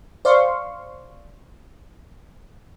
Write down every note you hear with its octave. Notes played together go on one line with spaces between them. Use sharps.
C5 D5 F5 C6 C#6